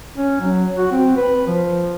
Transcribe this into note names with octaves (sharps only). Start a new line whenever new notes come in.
C#4
F#3
F#4
C4
B4
F3